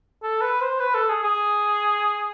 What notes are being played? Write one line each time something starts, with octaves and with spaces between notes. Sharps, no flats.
A4
B4
C5
B4
A4
G#4
G#4